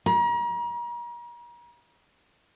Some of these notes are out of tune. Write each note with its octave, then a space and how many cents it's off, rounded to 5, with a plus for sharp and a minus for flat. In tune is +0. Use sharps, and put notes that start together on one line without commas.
A#5 +40